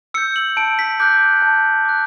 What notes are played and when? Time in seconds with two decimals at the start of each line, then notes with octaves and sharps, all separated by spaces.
0.14 E6 G6 C#7
0.36 F#7
0.57 A5 D7
0.79 B6
1.00 D6 F#6 G6
1.42 A5
1.85 D6 F#6